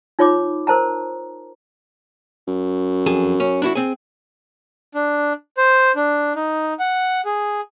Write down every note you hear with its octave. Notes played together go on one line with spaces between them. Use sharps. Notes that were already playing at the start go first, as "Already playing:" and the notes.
D#4 F4 C#5 B5 D6
A#4 C5 A5 A#5
F#2
F2 G#4 A4
C#4
D4 E4 F#4
C4 G#4
D4
C5
D4
D#4
F#5
G#4